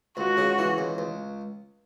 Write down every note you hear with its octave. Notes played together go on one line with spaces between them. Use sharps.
C#2 F#4
C#3
E3
C#2
C#2